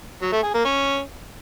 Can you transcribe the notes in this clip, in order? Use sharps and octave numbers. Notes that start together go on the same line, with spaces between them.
F#3
A3
G#4
A#3
C#4